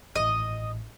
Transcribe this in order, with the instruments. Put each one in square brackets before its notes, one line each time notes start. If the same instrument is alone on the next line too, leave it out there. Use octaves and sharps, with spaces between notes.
[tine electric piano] A1 A2 [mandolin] D#5